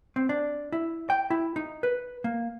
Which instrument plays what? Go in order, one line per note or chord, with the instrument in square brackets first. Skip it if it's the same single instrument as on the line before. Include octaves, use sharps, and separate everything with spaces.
[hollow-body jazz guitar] C4
D4
E4
G5
E4
D#4
B4
A#3